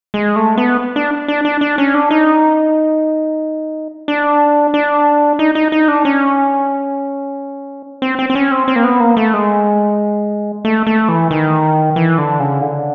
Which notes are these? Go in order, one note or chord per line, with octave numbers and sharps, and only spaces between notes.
G#3
A3
B3
D4
D4
D4
D4
C#4
D4
D#4
D4
D4
D#4
D#4
D#4
D4
C#4
C4
C4
C4
C#4
C4
C4
A#3
B3
A#3
A3
G#3
A3
A3
E3
D#3
E3
D3
C#3
D3